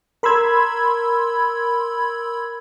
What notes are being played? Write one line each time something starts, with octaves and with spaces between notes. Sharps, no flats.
A#4 B5 C6 E6 G#6